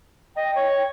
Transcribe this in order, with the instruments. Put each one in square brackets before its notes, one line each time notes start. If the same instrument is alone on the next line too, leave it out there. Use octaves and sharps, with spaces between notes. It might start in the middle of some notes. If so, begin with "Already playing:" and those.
[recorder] D#5 [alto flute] G5
[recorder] C#5